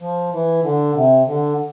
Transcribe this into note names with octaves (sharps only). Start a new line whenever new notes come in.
F3
E3
D3
C3
D3